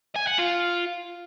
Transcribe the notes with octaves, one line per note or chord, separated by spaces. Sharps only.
G#5
F#5
F4